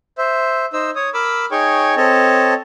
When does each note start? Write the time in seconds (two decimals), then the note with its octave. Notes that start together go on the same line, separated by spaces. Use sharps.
0.18 C5 E5
0.73 D#4 C5 E6
0.96 C#5 D#6
1.14 A#4 B5 D6 E6
1.51 D#4 G#4 C#5 G5 C#6
1.97 C4 A4 C#5 D#5 A5